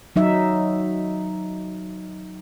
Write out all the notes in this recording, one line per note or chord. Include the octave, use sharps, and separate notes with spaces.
F#3 D#4 E5